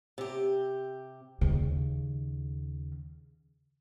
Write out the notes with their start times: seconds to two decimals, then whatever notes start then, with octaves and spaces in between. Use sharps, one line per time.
0.18 C3 G4
1.41 D#2 C#3